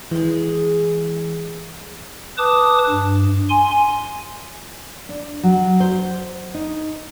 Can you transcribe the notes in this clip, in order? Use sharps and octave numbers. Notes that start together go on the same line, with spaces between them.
E3 G#3 G#4
B4 A5 D6 D#6
G2
G#5 C6
D4
F#3
C5
D#4